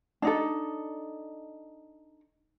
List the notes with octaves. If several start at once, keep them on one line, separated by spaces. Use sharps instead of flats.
D4 D#4 A4